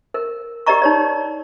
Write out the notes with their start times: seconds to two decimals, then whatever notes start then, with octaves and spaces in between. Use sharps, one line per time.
0.14 A#4
0.66 G4 A#4 D5 D#5 A#5 C#6
0.82 D#4 C#5 D5